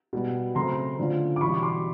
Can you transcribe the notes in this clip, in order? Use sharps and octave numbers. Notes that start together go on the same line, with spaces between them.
B2 G3 B3
C#3 F#3 A3 C4 A#5 C6
D3 F3 A3 C#4 F4
D6
E2 B2 G3 B5 C#6
C6 D6